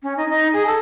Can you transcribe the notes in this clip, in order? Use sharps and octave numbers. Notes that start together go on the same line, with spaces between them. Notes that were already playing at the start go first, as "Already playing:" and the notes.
C#4
D#4
D#4
G#4
A4